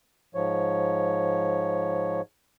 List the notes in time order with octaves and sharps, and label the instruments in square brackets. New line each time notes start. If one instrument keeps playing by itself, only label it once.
[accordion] G#2 F3 C#5